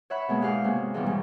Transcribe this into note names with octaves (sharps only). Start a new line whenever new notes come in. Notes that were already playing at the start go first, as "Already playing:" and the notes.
C#5 E5 F#5 B5
B2 G#3 A#3
G#2 G4 F5 F#5
C3 G#3 A#3 F#4
G#2 B2 E3 F3 G3
D#2 G#2